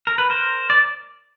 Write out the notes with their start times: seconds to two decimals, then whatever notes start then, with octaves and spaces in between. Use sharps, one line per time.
0.07 A#4
0.18 B4
0.30 A#4 C5
0.70 D5